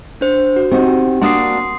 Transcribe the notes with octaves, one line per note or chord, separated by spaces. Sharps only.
D4 C5
F#4
C4 D#4 F#4 G4
A#3 D4 F#4 C6 D#6 C7